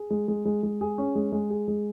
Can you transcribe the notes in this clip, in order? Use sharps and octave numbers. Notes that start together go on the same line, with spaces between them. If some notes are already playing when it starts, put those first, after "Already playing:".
Already playing: G#4
G#3
G#3
G#3
G#3
G#4
C#4
G#3
G#3
G#4
G#3